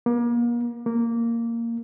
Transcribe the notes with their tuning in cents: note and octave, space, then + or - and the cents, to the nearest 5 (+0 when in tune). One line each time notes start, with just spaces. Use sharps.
A#3 +35
A#3 -10